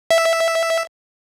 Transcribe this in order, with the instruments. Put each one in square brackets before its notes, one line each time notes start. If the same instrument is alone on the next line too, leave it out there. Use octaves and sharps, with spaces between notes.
[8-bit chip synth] E5